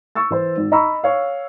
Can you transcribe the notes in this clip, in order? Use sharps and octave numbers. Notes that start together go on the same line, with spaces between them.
C#6 E6 A6
E3 C5
G#1
D#5 A#5 B5 C#6 E6
C#5 F5